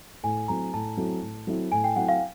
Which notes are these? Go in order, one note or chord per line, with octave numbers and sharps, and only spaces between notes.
A2 G#5
F#3 A3 C4 E4 A#5
A2 A5
F#3 A3 C4 E4
A2
F#3 A3 C4 E4
A2 G#5
G5
F#3 A3 C4 E4 F#5
F5